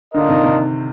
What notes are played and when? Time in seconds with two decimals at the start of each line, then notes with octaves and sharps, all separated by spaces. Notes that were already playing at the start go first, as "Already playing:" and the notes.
0.14 D3 A#3 D4 F4 A#4 D#5
0.28 C3 D#3
0.44 C3 D#3